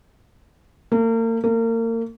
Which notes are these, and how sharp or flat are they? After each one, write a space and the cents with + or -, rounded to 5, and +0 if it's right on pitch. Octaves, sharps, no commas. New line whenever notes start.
A#3 -40
A#3 -35